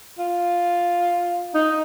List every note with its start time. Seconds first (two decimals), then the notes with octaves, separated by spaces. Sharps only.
0.19 F4
1.54 D#4